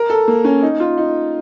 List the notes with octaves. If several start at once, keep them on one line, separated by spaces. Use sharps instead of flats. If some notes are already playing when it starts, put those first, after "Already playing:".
Already playing: A#4
A4
A#3
C#4
D#4
F4
D#4